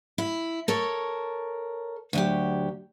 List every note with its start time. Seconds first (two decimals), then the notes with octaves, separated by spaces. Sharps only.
0.18 E4
0.68 A4 A#4 C#5
2.13 D2 F#3 G4